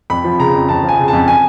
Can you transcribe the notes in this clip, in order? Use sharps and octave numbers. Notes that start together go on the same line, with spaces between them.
F2 B5
F3
C#3 A#5
F2
F2 A5
F3
G#5
C#3
A5
F2
G#5